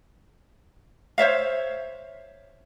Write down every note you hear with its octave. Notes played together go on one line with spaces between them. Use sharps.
C5 C#5 E5 F5